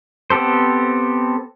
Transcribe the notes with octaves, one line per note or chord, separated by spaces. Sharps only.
B3 C4 G4 A4 C5